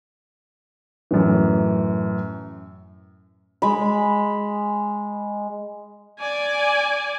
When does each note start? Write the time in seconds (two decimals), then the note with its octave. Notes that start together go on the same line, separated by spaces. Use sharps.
1.11 F#2 A2 E3
3.62 G#3 B5
6.20 D5 G#5